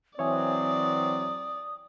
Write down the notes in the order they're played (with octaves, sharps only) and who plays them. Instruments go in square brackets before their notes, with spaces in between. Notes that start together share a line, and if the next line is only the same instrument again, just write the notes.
[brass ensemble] E3 F#3 C4 [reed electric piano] C#5 E5 G#5 [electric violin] D5 [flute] D#6